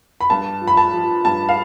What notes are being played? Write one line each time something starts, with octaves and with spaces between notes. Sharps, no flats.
B5
G2 A5
F3
B5
A5
F3
G2 A5
F5